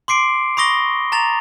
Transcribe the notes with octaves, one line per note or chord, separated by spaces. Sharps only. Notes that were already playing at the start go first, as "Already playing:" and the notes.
C6 D6 C7 D7
B5 C#6 D#6 A#6 G7
A#5 A6 F7